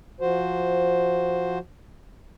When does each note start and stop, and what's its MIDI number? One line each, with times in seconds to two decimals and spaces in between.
0.21 1.58 53
0.21 1.58 66
0.21 1.58 72